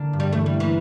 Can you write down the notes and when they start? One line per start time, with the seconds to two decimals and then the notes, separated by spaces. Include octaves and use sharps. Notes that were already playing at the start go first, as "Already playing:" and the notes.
Already playing: D3 A#3 D4
0.13 G2
0.20 G3
0.33 E3 A3
0.46 G3
0.53 A#3
0.60 E3